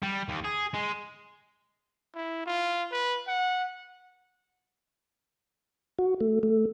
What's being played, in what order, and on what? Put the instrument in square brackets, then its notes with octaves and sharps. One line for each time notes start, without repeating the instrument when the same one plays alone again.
[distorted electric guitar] G3
D#2
G#4
G#3
[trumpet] E4
F4
B4
F#5
[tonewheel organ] F#4
A3
A3